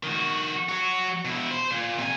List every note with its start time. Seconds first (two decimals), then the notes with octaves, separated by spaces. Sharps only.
0.03 D#3 F#4
0.69 F#3 F#4
1.25 B2 E4
1.51 C5
1.71 A#2
1.98 C3 G#5